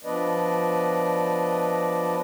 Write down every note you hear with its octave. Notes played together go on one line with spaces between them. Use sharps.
F3 B3 D4 B4 D5 D#5